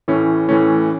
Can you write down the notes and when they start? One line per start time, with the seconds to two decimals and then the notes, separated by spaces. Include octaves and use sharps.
0.08 A2 E3 A3 C#4
0.49 A2 E3 A3 C#4